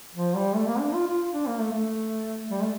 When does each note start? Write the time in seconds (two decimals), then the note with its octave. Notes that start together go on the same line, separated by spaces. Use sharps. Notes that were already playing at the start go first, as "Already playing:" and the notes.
0.15 F3
0.35 G3
0.55 A3
0.67 A#3
0.80 D4
0.94 F4
1.07 F4
1.33 D4
1.47 A#3
1.59 A3
1.72 A3
2.51 G3
2.62 A3